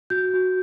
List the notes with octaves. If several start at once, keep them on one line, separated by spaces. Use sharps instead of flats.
F#4 G6
F#4